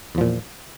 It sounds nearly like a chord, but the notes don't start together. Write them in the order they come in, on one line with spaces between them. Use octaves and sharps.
E2 F3 A#2